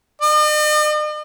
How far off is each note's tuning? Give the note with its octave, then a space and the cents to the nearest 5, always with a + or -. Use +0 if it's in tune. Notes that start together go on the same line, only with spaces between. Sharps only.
D#5 -45